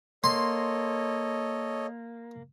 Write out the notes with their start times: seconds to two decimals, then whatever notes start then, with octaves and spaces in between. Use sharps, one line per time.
0.24 A#3 A4 C#5 D#5 C6